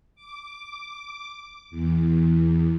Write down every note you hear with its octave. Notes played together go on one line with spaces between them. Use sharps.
D6
E2